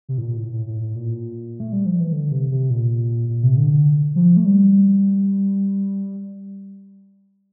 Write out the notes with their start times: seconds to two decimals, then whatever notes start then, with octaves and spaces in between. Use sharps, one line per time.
0.09 C3
0.18 A2
0.22 A#2
0.37 A2
0.52 A2
0.67 A2
0.81 A2
0.96 A#2
1.60 A3
1.72 G3
1.86 F3
2.00 E3
2.12 D3
2.31 C3
2.51 C3
2.70 A#2
3.29 A#2
3.43 C3
3.58 D3
3.73 D3
4.16 F3
4.37 A3
4.46 G3